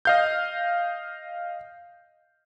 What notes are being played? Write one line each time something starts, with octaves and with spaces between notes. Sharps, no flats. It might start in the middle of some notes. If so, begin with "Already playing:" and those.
D#5 F5 G6